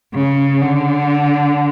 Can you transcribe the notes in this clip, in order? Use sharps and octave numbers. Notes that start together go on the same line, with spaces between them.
C#3
D3